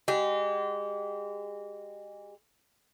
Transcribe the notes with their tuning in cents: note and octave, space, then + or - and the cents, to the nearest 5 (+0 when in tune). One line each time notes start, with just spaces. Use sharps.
G#3 -30 G4 -30